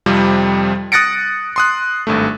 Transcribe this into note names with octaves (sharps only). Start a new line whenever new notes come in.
F2 C3 F3 G3
D#6 F#6 A6 A#6 C#7 D7
C6 D#6 F#6
G#1 G2 A3